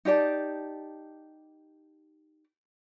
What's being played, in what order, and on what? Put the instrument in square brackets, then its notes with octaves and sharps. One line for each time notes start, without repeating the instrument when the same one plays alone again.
[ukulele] D#4 G4 D5 A5